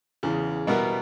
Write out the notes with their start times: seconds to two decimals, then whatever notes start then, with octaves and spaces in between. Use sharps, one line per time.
0.23 E2 C#3 E3
0.67 B2 G3 B3 E4 A#4